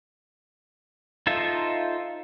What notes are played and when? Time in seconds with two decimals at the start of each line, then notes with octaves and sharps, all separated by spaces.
1.27 D#4 F4 A4 C5 E5